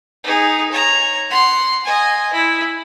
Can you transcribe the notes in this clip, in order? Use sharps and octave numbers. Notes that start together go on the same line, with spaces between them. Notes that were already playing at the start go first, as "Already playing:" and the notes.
D#4 G#4
C#5 A#5
F#5 C6
D#5 G#5
E4